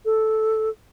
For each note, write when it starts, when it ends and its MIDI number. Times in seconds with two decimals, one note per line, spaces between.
0.05 0.69 69